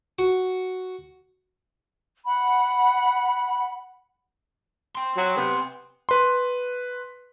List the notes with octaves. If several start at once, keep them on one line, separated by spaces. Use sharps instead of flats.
F#4
F#5 B5
G5 C6
F#3
C3 B3
B4 C6